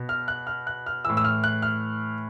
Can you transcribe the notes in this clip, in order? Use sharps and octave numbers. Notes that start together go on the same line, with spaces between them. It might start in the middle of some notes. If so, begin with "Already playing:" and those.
Already playing: B2
F6
F#6
F6
F#6
F6
A2 E3 E6
E6
F6
F#6
F6